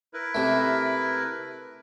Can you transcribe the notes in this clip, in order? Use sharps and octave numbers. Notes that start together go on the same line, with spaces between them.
E4 A#4 B4
C3 A3